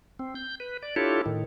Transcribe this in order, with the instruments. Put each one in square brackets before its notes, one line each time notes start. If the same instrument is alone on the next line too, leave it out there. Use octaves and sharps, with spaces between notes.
[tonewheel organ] C4
G6
B4
D5
D4 E4 F4 G4 A4 C#5
A2 D#3